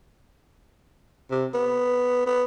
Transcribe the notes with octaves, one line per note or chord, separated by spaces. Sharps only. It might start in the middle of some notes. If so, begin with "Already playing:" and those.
C3
B3
B3